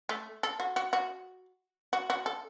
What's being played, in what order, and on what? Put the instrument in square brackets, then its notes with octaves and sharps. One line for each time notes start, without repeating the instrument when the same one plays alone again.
[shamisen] A3
A4
F#4
F#4
F#4
F#4
F#4
A4